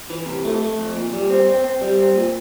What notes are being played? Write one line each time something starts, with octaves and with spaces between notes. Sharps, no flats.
E3
C3
A3
A3
F2
A#2
G3
C4
C4
C4
G3
C4
A#2